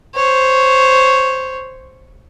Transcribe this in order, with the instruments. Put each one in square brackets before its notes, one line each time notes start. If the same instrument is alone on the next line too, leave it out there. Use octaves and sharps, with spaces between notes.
[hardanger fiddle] C5 C#5